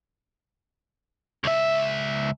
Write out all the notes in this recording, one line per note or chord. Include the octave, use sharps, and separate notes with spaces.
C#2 E5